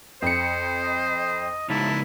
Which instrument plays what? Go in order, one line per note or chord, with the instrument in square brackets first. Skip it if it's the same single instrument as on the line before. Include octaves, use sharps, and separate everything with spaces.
[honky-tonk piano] F2 C#7 [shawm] C5
[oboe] D#5
[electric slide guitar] C#3 G#3 D#4 [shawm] E4 [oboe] A5